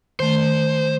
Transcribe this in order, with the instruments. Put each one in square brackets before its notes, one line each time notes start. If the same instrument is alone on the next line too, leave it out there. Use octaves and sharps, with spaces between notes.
[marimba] D#3 A3 [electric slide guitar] C5